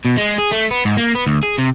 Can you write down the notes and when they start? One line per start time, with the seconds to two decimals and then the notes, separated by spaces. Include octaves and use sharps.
0.05 B2
0.17 G#3
0.38 G#4
0.51 A3
0.71 B3
0.85 G#2
0.97 A#3
1.15 B3
1.27 D2
1.43 G#4
1.58 C3